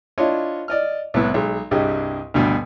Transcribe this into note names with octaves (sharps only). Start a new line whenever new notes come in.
D4 E4 F4 C#5 D#5
D5 D#5 F6
C2 A2 B3 E4
B1 G#3
C2 G2 G4 G#4 D#5
D2 G2 B2